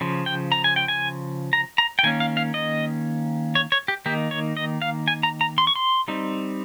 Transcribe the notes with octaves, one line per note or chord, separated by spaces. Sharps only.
C#3 F3
G5
A#5
G#5
G5
G#5
A#5
A#5
G5
D#3 A#3 C#4 G#5
F5
F5
D#5
C#5
C#5
G4
D#3 A#3 D#4 G4
C#5
D#5
F5
G#5
A#5
A#5
C6
C#6
C6
G3 C4 D#4